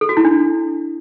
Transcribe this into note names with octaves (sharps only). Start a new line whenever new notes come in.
A4
F#4
E4
D4